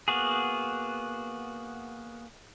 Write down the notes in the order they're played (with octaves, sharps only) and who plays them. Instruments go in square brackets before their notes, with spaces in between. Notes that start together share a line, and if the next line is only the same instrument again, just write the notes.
[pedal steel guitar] A#3 B3 F#4 G#4